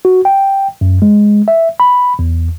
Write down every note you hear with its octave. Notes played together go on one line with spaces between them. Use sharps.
F#4
G5
F#2
G#3
E5
B5
E2